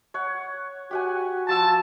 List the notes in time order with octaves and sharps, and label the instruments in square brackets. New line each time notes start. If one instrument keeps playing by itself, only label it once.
[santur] C#5 F#5
[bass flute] F#4 [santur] G4 F#5 G#5
[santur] F3 E6 [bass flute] F#4 [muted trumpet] A5